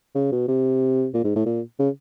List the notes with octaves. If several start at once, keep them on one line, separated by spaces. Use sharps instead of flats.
C#3
B2
C3
A#2
G#2
A2
A#2
C#3